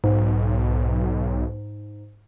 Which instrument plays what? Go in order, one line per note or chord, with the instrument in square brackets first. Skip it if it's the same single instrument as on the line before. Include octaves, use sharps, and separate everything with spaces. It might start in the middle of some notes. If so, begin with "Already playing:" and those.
[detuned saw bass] B1 [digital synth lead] G#2